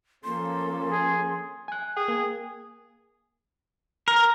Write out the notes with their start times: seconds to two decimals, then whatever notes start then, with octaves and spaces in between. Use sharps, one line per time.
0.24 F3 A#3 C#4 A4 C6
0.91 G#4
1.68 G#5 F#6
1.96 G#4 G5
2.08 A#3 G#5
4.08 A#4